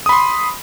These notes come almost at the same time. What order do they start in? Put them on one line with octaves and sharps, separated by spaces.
D#6 B5 C6